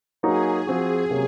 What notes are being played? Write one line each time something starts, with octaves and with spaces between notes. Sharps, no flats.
F#3 A#3 D#4 F#4 G#4
F3 C4 F#4
C3 F#3 A#3 C#4